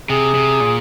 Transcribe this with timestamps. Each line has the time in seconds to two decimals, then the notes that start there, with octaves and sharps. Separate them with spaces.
0.10 C3 G#4
0.35 C3
0.60 A#2